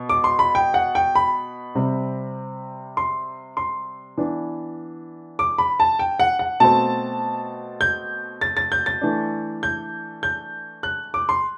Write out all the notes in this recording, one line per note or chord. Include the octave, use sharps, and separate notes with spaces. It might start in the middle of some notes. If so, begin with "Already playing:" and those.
Already playing: B2
D6
C6
B5
G5
F#5
G5
B5
C3 G3 C4
C6
C6
E3 B3 D4
D6
B5
A5
G5
F#5
F#5
B2 A3 C4 A5
G6
A6
A6
G6
A6
E3 A3 D4
G6
G6
F#6
D6
C6